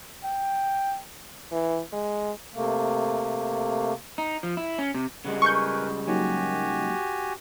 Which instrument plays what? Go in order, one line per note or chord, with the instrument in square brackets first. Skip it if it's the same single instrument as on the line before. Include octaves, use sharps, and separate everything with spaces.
[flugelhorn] G5
[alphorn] E3
G#3
[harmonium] C3 A3 A#3
[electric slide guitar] D#4
F3
E4
C#4
C3
[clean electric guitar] C#3 G3 G#3 [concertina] F#5
[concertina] A#4 B4 G#5 [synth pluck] C#6 G6
[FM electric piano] F#3 A#3 D#4 [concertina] F#4 G4 G#5